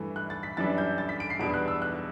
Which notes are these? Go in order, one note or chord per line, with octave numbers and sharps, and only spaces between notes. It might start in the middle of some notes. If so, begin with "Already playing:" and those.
Already playing: G2 E3 A3
F#6
A6
B6
F#2 E3 G3 D4 A6
G6
A6
B6
D7
C7
E2 B2 G3 D4 D7
F#6
E6
F#6